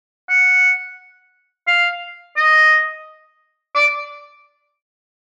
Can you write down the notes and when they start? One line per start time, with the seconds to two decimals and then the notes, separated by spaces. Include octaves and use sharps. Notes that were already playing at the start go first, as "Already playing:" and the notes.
0.29 F#5
1.68 F5
2.37 D#5
3.75 D5